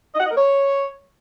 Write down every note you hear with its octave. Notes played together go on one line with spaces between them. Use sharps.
D#5
F#5
D#5
A#4
C#5